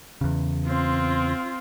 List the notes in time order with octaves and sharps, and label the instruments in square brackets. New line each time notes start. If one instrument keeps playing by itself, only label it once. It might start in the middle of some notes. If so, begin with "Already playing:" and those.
[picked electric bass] E2 C#3
[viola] C4 F4